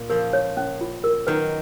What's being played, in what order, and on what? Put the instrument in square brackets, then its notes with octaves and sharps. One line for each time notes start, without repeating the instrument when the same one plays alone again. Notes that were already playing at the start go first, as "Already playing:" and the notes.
Already playing: [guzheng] A#2
[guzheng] C#3 F3 [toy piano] A#4
[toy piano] C#5
C#4
F4
A#4
[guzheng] D#3 F#3 [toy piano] B4